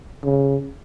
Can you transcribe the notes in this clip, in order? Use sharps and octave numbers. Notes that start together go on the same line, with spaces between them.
C#3